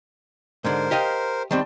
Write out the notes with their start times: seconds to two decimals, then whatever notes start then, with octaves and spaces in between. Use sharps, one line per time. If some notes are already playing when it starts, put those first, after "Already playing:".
0.65 G#2 D3 A#4 C5
0.91 G4 D#5 F5
1.51 D#3 G3 C4 A5